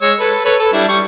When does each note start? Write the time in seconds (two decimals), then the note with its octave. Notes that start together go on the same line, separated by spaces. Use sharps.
0.02 G#3 C#5 E6
0.20 A4 B4
0.45 A4 B4 C#5
0.60 A4
0.73 G3 D4 E4
0.88 G3 C#6